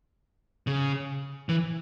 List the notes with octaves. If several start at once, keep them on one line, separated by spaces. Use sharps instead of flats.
C#3
E3